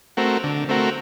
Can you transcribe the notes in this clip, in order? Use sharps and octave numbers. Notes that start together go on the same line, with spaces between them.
A3 C4 F#4 A#4
D3
A3 C4 F#4 A#4